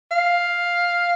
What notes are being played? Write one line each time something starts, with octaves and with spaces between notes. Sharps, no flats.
F5